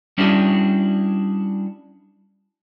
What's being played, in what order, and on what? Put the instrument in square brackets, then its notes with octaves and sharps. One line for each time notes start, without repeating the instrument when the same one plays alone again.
[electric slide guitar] G3 C#4 D4 E4 F#4 G#4